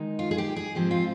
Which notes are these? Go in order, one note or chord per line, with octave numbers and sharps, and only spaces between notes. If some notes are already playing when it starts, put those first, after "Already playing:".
Already playing: D#3 G#3 D#4
F4
G#4
G4
G#4
G#2 F3 G#3 C4 G4
F4